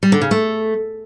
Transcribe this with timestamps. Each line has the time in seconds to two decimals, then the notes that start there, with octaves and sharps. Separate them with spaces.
0.03 G3
0.12 D3
0.22 C#3
0.31 A3